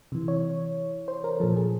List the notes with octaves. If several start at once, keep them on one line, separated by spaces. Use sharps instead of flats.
C3 E3
C#5
C5
A#4
A#2 F3 A4
G#4